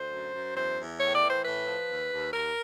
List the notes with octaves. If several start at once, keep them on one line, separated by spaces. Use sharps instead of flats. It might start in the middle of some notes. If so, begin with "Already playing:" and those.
Already playing: D2 C5
F#2
F#2
E2 C5
E2
A2 C#5
D5
E3
C5
A2 B4
F3
D#2
D#2
D#2 A#4